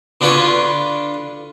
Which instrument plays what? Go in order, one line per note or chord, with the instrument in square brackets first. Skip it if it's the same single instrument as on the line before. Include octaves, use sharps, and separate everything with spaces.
[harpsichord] D3 D4 F4 B4 G#5 C#6